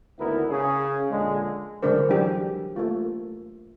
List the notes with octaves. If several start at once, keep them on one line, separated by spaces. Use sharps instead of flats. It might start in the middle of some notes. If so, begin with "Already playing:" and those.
G#1 D2 B3 E4 A#4
C#3 C#4 G#4
A#1 D3 G#3
D3 G3 G#3 D4 A#4 C5
E3 F#3 D4 G4 G#4
A3 A#3 F4